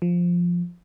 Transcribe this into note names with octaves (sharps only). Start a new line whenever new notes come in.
F3